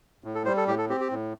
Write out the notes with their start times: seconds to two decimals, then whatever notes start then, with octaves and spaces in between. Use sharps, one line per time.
0.24 A2
0.35 A4
0.45 G3 C5
0.57 A4
0.67 A2 G4
0.78 A4
0.89 C4 G4
1.00 G4
1.11 A2